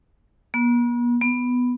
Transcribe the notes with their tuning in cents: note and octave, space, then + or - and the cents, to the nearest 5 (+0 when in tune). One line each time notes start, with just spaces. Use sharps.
B3 -45
B3 +0